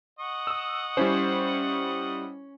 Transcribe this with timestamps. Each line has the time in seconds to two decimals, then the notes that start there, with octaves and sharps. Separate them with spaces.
0.19 D#5 F#5 C#6
0.47 D#6 E6
0.97 G3 C#4 E4 C5